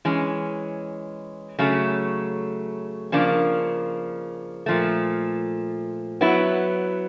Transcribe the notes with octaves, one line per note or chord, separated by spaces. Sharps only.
E3 G#3 C#4
C#3 F#3 A3
C#3 F3 A#3 D4
A#2 F3 A3
F#3 B3 E4